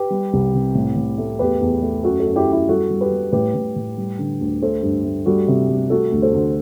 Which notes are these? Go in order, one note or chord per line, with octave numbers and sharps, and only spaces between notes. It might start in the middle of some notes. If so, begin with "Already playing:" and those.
Already playing: G4 B4
G3
C2
C3
A2
A2
A3
E2 G4 B4
E2
A3
F#2 F#4 A4
F#4 A4
F#2
E4 G4
F#2
E4 G4
G3 F#4 A4
G3
G4 B4
G3
A2 G4 B4
A2
A2
G3
D3
D2
A3 A4 C5
G2
A3
G3 F#4 A4
C3
G3
A3 F#4 A4
D2
A4 C5
D2